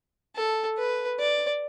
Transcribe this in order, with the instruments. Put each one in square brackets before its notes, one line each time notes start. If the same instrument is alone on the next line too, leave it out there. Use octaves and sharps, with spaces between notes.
[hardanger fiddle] A4
B4
D5